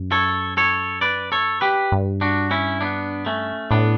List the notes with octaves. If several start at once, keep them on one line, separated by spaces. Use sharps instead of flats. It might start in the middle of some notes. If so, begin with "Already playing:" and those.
Already playing: F#2
A4 C#5
A4 C#5
B4 D5
A4 C#5
G4 B4
G2
D4 F#4
C#4 E4
B3 D4
A3 C#4
A2 B3 D4